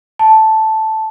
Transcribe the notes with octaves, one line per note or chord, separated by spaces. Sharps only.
A5